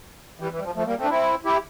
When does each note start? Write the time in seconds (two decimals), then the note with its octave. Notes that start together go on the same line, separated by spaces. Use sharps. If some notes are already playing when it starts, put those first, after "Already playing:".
0.40 E3 G3
0.51 E3
0.59 G3
0.64 F3
0.75 F3 A3
0.86 G3 A#3
0.99 A3 C4
1.04 D4
1.10 C4 E4
1.45 E4 G4